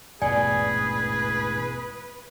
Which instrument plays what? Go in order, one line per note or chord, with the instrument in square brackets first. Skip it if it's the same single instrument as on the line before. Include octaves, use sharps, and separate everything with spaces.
[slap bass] E1 A1 G#2 [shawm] G#4 [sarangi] B4 [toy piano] D5 G5 G#5